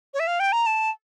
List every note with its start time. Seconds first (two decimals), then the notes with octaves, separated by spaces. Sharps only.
0.14 C#5
0.20 E5
0.27 F5
0.40 G5
0.52 A#5
0.66 A5